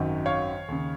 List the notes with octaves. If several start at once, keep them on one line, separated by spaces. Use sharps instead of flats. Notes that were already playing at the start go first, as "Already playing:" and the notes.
Already playing: G#1 F#2 D#3
C#5 F5
D#2 C#3